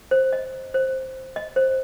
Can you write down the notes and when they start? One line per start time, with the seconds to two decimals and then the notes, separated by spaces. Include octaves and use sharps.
0.11 C5
0.33 D#5
0.74 C5
1.36 D#5
1.56 C5